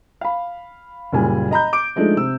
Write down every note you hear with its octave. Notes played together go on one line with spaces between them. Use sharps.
F5 B5
F#1 A#2 G3 G#5
D#5 A#5 B5 G6
D6 D7
F3 G#3 A3 D4 D#4
C3 E6